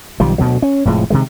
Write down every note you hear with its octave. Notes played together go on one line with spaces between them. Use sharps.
B1 D#3 F3 G3
D2 B2 F3 F#3
C#4
F1 A2 F3 G#3
C3 D#3 G#3